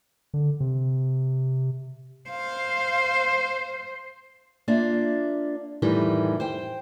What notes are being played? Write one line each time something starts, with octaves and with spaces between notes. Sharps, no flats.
D3
C3
C5 F5
A#3 D4 F4 D5 E5
F2 A2 D#3 E3 G3
C5 G5